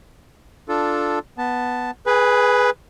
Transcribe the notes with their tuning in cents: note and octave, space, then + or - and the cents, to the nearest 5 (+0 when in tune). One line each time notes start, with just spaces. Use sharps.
D4 +0 F4 +0 A4 +0
B3 +0 A5 +0
G#4 +10 B4 +0 G#5 -30